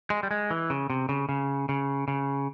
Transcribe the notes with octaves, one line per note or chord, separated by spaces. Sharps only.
G#3
G3
G#3
E3
C#3
C3
C#3
C#3
C#3
C#3